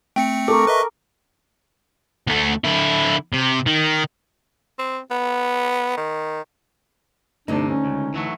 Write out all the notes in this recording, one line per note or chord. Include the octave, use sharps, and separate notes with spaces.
A3 C4 G5 C#7
A4 A#4 C#6 D6
B4 D#5 E5
D2 A3
D3 E4
C3
D#3
C4
B3
D#3
D2 G2 C3 D4 D#4
C#4
C#2
E3 F#3 A3